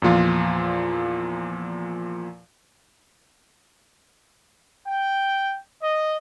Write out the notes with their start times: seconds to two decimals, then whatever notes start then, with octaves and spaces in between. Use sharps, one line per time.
0.02 E2 A#2 F3 F4
4.88 G5
5.82 D#5